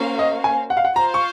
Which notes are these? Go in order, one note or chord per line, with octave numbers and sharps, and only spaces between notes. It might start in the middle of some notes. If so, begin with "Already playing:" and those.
Already playing: A#3 C#4 F#4 C5 F5
D#5
G#5
F#5
F5
F#5
F4 C5 F5 A#5
C#6